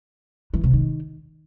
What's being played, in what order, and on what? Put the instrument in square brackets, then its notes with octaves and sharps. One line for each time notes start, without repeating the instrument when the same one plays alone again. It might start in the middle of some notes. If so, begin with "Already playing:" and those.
[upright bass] E3
C3
D#3